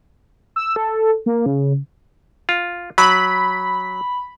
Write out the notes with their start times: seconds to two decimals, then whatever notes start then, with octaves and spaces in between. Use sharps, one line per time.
0.56 E6
0.76 A4
1.26 A#3
1.46 C#3
2.49 F4
2.98 F#3 B5